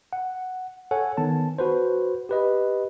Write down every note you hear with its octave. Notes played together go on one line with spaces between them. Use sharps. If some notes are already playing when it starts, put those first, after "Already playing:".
F#5
A4 C#5 F#5 G#5
D#3 B3 A5
F#4 B4 C5
G4 B4 D#5